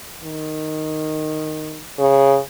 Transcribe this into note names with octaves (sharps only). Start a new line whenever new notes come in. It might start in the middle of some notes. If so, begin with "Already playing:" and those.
D#3
C#3